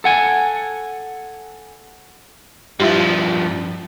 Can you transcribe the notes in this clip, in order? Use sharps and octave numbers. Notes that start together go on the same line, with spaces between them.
A4 F#5 G#5
G2 F3 E4 F4 G4